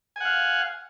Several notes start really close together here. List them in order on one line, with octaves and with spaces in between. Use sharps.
G#5 F#5 F5